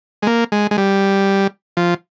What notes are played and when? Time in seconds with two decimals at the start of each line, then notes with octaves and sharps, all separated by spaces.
0.22 G#3
0.27 A#3
0.52 G#3
0.71 G#3
0.78 G3
1.77 F3